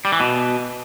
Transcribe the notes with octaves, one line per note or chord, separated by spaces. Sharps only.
G3
E3
B2